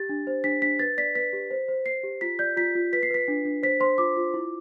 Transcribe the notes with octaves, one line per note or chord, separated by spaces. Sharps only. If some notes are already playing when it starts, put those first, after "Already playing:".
Already playing: G4 A6
D4
C5
D4 B6
D4 B6
B4 A6
D5 B6
B4 B6
G4
C5
C5
C5 C7
G4
F4 B6
D5 G6
F4 B6
F4
B4 B6
C7
B4 B6
D4
D4
C5 B6
C5 C6
F4 D6
F4
E4